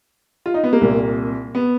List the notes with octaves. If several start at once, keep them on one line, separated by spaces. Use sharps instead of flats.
F4
D#4
B3
A#3
C2 A#2
B3